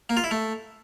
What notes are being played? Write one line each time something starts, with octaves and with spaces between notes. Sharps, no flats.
A#3
F4
E4
A3